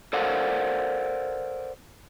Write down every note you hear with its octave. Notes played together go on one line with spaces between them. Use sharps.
A4 A#4 C5 D5 F5 F#5